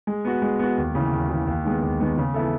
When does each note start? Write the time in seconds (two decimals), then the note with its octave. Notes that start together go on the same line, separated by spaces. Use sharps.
0.07 G#3
0.25 B3 F#4
0.42 G#3
0.59 B3 F#4
0.78 D#2
0.95 C#3 E3
1.13 D#2
1.30 C#3 E3
1.47 D#2
1.65 D#3 G#3 B3
1.82 D#2
2.00 D#3 G#3 B3
2.18 C#3
2.34 E3 B3 E4 A4